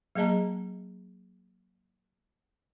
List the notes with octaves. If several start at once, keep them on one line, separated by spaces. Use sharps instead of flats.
F#3 A#3 G#4 D#5 A5 A#5